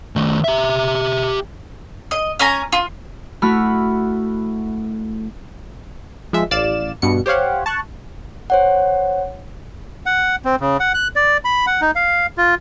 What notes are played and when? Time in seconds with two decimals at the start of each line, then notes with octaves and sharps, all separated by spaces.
0.16 D#3 A3
0.44 G4 E5
2.11 D#5
2.39 C#4 G#5 A#5
2.72 F4
3.42 A3 E4 F#4 B5 F6
6.33 F3 G#3 E5
6.51 A1 D5 F5 E7
7.02 G2 B2 C#7
7.26 G4 C5 C#5 F5 F#5
7.66 A5 C#6 F#6
8.50 C5 C#5 F#5
10.06 F#5
10.45 C4
10.60 C#3
10.80 F#5
10.94 F#6
11.16 D5
11.45 B5
11.67 F#5
11.81 D#4
11.96 F5
12.37 F4